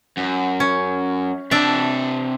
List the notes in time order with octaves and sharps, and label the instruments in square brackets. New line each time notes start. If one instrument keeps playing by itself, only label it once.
[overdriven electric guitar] F#2
[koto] C#4
[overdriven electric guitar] C3 A5 [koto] D4 E5